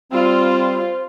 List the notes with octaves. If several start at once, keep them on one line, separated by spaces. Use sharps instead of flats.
G3 C4 F4 C5